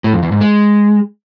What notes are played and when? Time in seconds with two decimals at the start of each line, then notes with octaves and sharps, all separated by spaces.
0.04 A2
0.13 F2
0.23 E2
0.32 G#2
0.41 G#3